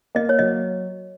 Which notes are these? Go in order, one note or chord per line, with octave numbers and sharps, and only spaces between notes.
A#3 D#5
C#5
F#3 D#5